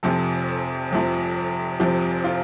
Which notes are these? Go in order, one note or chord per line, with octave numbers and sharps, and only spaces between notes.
F1 F2 C3 F3 A4
F1 F2 C3 F3
F1 F2 C3 F3 G4
F4